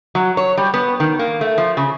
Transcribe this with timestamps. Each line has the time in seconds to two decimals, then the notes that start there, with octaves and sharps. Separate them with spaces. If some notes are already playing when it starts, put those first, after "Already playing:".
0.15 F#3
0.37 C#5
0.57 G3
0.74 B3
1.00 D#3
1.19 A#3
1.41 A3
1.58 F3
1.77 C#3